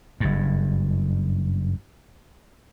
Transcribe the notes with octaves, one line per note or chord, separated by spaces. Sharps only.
F#1 G2